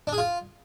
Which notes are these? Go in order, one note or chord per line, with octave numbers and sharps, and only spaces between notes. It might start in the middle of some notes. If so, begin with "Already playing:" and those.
D4
G#4
F4